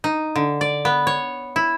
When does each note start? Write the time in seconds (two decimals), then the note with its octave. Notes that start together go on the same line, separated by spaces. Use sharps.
0.04 D#4
0.36 D3
0.61 D5
0.85 B3
1.07 C#5
1.56 E4